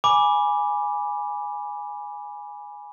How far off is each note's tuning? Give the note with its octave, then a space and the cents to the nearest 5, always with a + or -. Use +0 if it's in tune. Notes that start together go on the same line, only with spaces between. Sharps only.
G#5 +0 B5 -15 D6 +0